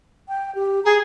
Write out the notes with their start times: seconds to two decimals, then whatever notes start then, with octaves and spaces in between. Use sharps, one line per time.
0.29 G5
0.55 G4
0.85 G#4 A#5